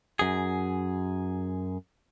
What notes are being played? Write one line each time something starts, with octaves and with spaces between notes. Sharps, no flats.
F#2 G#4